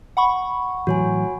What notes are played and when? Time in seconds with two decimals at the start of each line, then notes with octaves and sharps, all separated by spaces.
0.17 F#5 B5 C#6
0.87 A2 E3 F#3 F#4 C#5 G#5